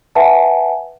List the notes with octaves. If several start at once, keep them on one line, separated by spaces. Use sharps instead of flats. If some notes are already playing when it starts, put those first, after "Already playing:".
B4 E5 F#5 G#5 A5